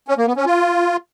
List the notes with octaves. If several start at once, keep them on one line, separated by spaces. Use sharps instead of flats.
C#4
A#3
B3
C#4
F4